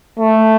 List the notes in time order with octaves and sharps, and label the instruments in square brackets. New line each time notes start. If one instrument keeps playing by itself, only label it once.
[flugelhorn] A3